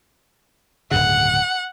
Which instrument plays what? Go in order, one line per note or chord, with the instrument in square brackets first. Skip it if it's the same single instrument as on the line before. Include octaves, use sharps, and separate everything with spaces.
[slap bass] D1 G2 C#3 [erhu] F#5